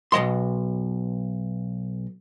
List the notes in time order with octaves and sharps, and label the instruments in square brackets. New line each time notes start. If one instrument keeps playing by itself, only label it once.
[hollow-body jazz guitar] B1 C#3 D#5 C6